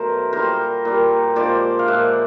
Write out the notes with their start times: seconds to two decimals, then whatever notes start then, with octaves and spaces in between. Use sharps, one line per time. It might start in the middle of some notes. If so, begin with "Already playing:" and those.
Already playing: B2 F#3 A3 A#4 C5
0.33 A#2 G3 A#4 C5
0.85 A#2 G3
1.36 A#2 F3 G#3 C5 D5
1.79 F5
1.87 A#2 F3 G#3 E5 F#5